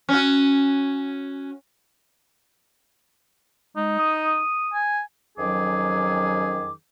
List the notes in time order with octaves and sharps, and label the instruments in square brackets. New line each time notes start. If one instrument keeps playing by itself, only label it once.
[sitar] C#4 F#4
[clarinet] G#3 [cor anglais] D#4
[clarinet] D#6
[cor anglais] G#5
[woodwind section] F2 D#3 F#3 C#4 G#4 D6